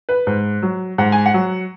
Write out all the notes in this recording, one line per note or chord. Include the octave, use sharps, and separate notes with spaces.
B4
G#2
F#3
G#2 F#5
G#5
F#5
F#3